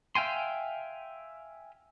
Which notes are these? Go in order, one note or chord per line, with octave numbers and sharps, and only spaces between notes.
E5 F5 G5 G#5 C6